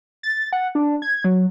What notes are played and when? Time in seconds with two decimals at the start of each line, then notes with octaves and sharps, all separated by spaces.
0.23 A6
0.53 F#5
0.75 D4
1.02 G#6
1.24 F#3